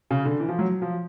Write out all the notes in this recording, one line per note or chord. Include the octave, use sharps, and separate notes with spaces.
C#3
D3
E3
F3
F#3
F3